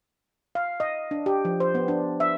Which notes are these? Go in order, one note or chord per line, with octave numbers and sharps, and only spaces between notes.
F5
D#5
D4
G4
F3
C5
B3
D4
E5